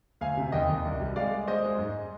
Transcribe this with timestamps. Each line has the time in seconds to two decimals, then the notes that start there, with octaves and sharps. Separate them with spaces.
0.21 D2 F5 G#5
0.37 C3
0.52 D#2 D#5 G5
0.69 D#2
0.85 C2
1.01 G3
1.16 G#3 D5 F5
1.32 G#3
1.47 G#3 C5 D#5
1.64 G#3
1.79 G#2